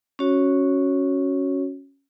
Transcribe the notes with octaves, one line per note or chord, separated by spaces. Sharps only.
C#4 F#4 C#5